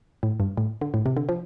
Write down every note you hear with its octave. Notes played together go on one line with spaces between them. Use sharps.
A2
G2
A2
D3
A2
C3
D3
F3